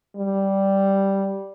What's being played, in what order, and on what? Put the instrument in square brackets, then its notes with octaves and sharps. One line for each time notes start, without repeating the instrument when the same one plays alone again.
[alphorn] G3